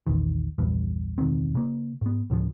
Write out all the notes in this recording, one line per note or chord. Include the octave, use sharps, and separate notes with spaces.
A#1 E2 D#3
A#1 E2 G2
E1 C#2 D#3 C4
C#3 A#3
G#2 B3
D2 A2 C#3 F3